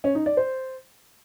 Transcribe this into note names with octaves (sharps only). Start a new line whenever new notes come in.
C#4
D#4
D5
C5